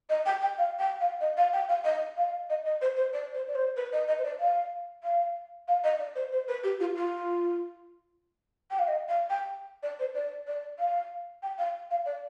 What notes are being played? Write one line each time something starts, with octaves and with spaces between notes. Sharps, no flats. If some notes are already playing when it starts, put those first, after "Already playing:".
D#5
G5
G5
F5
G5
F5
D#5
F5
G5
F5
D#5
F5
D#5
D#5
C5
C5
D5
C5
D5
C5
B4
D#5
D#5
C5
D5
F5
F5
F5
D#5
D5
C5
C5
B4
G4
F4
F4
G5
F5
D#5
F5
G5
D5
C5
D5
D5
F5
G5
F5
F5
D5